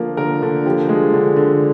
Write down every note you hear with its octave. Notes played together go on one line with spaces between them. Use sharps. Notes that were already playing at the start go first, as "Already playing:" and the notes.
Already playing: D3 F3 A#3
D3 A#4
D3
F3 G4
G#3
D3
D3